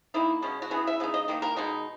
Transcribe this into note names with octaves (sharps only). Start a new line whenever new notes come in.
D#3 A#3 D#4 E4
B2 G#3 C#4
F#4
C#3 E3 B3 G#4
E5
C#3 G#3 D#4
D#5
D#3 A#3 D#4
A#4
B2 G#3 D#4